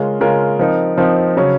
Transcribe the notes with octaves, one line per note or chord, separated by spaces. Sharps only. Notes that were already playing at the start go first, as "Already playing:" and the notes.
Already playing: C#3 G#3 C#4 F4 A#4
C#3 G#3 C#4 F4 A#4
F3 C4 D#4 A#4
F3 C4 D#4 A#4
C#3 F#3 C#4